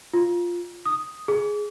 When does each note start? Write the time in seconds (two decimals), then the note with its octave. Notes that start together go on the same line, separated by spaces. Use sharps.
0.14 F4
0.86 D#6
1.28 G#4